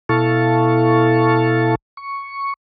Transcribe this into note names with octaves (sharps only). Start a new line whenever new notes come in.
B2 E4 A4 F5 A5 C#6
C#6